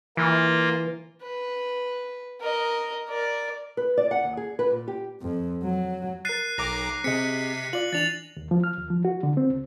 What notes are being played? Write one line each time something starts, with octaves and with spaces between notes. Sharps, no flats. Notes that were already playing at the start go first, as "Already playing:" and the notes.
E3 A#3 F4
B4
A#4 D#5
A#4 D5
B4
D5
F#5
D#2
G#4
B4
A#2
G4
F2
F#3
A#4 F#6 A6 C7 D#7
B1 A#5 D6 A#6
C3 C4 G#4 D#5 B6 C#7
F4 D5 F#7
E3 D4 A6 F7 F#7
D#2
F3
F6
D#2
F3
F#4
D3
C4
C#2